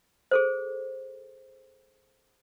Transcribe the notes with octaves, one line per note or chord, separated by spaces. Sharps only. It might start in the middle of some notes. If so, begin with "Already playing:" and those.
G#4 A4 C5